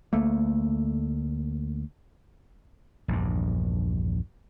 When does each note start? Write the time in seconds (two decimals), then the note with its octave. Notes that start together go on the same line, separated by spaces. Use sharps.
0.13 D2 A3 A#3
3.08 A#1 E2 G2